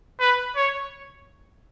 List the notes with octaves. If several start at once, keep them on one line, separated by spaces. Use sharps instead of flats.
B4
C#5